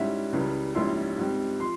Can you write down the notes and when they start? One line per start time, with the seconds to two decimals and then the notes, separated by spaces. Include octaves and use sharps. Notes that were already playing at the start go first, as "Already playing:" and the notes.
Already playing: G#2 G3 C#4 E4 E5
0.33 C#2 C#3 E3 G3
0.75 A#1 G#2 G3 C#4 E4 C6
1.18 G#2 G3 C4
1.60 F3 C6